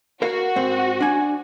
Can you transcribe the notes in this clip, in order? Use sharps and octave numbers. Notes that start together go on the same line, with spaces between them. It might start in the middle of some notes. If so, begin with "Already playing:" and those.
F#4 A#4 F5
G#2 C4
D4 G#5